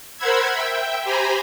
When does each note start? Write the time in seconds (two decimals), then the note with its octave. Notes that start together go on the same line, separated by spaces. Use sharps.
0.17 A#4 C5 F#5 B5 E6 G#6
0.52 E5 G5
1.04 G4 C5 G#5 A#5 B5